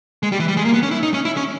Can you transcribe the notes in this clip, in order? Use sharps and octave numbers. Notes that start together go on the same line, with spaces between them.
G#3
G3
E3
G3
G#3
A#3
B3
C#4
E4
D#4
C#4
E4
C#4